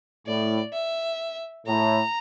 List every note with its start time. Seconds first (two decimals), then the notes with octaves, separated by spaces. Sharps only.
0.27 A2 D5
0.73 E5
1.66 A2 A#5